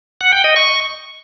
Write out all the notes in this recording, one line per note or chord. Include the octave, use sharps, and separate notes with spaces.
F#5
G5
D#5
C#6